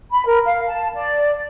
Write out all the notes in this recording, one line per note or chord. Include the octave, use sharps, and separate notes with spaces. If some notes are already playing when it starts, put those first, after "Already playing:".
B5
A#4
F5
A5
D5